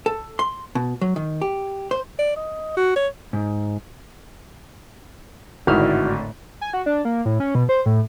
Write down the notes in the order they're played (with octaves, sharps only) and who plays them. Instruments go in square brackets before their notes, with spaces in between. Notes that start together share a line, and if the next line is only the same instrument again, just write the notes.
[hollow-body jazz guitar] A4
C6
B2
F#3
D#3
G4
C5
[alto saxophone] D5
D#5
F#4
C#5
[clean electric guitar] G#2
[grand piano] G#1 [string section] A2 D3 [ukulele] D#4 E4 E5 [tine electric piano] F#4 F6
[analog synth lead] G#5
F#4
D4
A#3
A2
C#4
B2
C5
A2